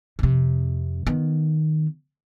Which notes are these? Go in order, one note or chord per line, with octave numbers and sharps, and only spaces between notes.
F2 C3
D#3 B3